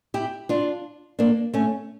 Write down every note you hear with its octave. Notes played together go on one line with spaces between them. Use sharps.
E4 G4
D4 F4
A#3 D4
A3 C#4